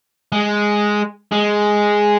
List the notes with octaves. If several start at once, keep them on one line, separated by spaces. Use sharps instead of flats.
G#3
G#3